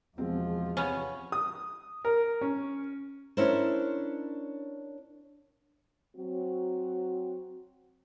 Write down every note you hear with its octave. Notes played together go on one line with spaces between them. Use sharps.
E2 B2 F3 G#3 C4
C3 B3 C#4
D#6
A#4
C#4
C#4 D4 E4 A#4 C5
F#3 C4 F#4